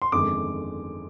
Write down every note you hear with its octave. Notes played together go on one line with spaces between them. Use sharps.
C6
G1 F2 D#3 G#3 D6